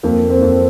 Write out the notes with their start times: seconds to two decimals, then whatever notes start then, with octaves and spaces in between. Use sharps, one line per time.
0.03 F2 A#3
0.30 C4
0.42 F2